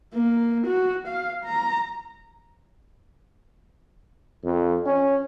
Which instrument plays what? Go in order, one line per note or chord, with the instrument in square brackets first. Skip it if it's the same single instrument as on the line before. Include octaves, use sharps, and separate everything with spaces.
[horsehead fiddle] A#3
F#4
F5
A#5
[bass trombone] F2
C#4